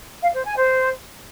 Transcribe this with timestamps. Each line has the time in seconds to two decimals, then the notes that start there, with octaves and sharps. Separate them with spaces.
0.22 F5
0.33 C5
0.45 G#5
0.56 C5